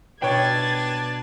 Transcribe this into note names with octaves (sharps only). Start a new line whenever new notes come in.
B2 D4 B4 C#5 G5 G#6 A6